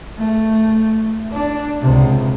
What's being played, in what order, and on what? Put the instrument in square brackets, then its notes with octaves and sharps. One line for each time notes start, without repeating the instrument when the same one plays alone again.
[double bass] A3
D4
C#2 C3